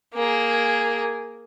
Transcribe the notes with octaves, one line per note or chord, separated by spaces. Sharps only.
A#3 G#4